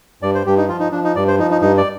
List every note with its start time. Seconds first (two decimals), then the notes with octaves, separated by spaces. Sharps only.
0.22 G2 D5
0.35 C5
0.46 G2 G4
0.57 D#4
0.69 F3 F4
0.80 D#4
0.92 F3 D4
1.04 D#4
1.16 G2 D5
1.28 C5
1.39 F3 D#4
1.51 D#4
1.61 G2 D#4
1.77 D5